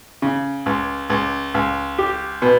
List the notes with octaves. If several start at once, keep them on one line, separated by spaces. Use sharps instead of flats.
C#3
C#2
C#2
C#2
G4
B2